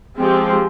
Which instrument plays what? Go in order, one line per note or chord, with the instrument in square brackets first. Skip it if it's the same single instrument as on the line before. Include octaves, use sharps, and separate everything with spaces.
[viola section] F3 G#3 C4 G4